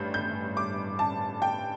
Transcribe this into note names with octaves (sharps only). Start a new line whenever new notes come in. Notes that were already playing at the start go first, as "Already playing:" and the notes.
Already playing: A1 G2 G3 G6
G6
D6
A5
G5